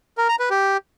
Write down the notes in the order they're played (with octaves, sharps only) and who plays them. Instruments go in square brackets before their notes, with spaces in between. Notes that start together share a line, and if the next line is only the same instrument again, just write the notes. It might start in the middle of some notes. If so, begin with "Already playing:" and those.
[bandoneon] A#4
A#5
B4
G4